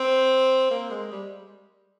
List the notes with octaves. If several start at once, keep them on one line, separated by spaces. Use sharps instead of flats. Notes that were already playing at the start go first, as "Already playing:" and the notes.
Already playing: C4
A#3
G#3
G3